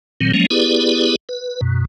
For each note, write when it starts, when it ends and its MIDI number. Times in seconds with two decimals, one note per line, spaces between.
0.21 0.32 46
0.21 0.32 51
0.21 0.32 54
0.21 0.32 60
0.34 0.46 53
0.34 0.46 54
0.34 0.46 56
0.34 0.46 58
0.34 0.46 61
0.51 1.16 59
0.51 1.16 64
0.51 1.16 67
0.51 1.16 68
0.51 1.16 71
0.51 1.16 74
1.29 1.61 71
1.61 1.85 42
1.61 1.85 47